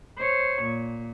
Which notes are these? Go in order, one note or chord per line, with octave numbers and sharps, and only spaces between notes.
C5 C#5
A#2